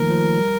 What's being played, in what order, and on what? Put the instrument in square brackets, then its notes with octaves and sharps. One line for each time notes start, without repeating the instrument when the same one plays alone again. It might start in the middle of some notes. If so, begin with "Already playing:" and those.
Already playing: [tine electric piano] D#3 F3 A3 A#3 [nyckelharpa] A#4
[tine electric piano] F3
G3